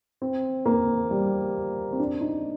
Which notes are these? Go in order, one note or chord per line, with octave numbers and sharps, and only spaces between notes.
C4
A#3
G3
C4
D4
D#4